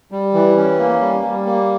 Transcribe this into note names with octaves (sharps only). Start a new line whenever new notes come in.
G3
E3
C#4
A#3
G3
G3
A#3